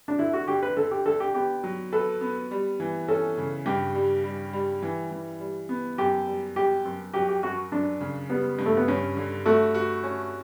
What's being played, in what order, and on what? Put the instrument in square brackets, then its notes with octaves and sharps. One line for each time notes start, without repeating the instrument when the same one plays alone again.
[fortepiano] D4
[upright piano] D3 [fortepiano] E4
[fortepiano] F#4
[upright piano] D3 [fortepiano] G4
[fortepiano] B4
[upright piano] D3 [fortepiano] A4
[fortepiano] G4
[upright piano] D3 [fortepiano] A4
[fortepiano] G4
[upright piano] B3 [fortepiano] G4
[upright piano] F#3
[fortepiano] A4 [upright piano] B4
[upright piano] B3
G3
E3
[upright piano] C#4 [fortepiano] A4
[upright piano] C#3
[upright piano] G2 [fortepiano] G4
[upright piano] G3
G3
G3
E3
E3
G3
B3
[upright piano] F#2 [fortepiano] G4
[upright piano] G3
[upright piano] G3 [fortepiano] G4
[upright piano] F#2
[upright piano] F#3 [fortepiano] G4
[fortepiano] G4
[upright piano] F#2 [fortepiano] F#4
[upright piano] F#2 [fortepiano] D4
[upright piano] C#3
[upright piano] G3 [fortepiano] B3
[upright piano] G2
[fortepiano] A3
B3
[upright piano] G2 [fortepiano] C#4
[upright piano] D3
[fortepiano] A3 [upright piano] F#4
[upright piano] F#4
C#4